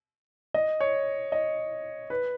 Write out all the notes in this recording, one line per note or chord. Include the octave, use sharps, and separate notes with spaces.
D#5
C#5
D#5
B4